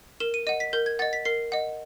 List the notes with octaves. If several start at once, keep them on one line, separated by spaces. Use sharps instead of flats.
A#4 E7
D#7
D#5 F#5 D#7
B6
A#4 G6
G#6
D#5 F#5 A6
B6
A#4 C7
D#5 F#5